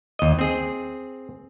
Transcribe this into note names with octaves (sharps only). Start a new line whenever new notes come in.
D#2 D#5
C4 G#4